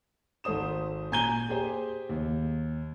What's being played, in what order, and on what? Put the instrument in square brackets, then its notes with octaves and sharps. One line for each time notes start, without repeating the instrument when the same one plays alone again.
[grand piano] G#1 A4 C5 D#6 E7
A#2 G#5 A#5 G6 D#7 G7
G4 G#4 C5
D#2